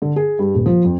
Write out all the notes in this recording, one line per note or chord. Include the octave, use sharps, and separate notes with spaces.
D3
G#4
G2
D#1
F3
F2